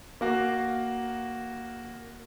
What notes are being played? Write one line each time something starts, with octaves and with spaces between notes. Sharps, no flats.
A#3 F#4 F5